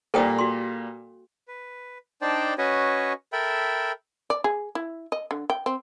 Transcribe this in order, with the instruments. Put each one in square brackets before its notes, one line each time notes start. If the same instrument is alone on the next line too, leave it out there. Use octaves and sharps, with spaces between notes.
[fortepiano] A#2 G3 A#3 [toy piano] A4 G5 D#6
[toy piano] F#4 C6
[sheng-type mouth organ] B4
D4 D#4 C5 D5 G5 A5
C#4 F#4 B4 C#5 D#5
A4 A#4 E5 G5 B5
[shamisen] D5
G#4
E4
D#5
D3
G5
C4